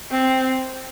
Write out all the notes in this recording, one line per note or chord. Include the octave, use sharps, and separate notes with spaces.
C4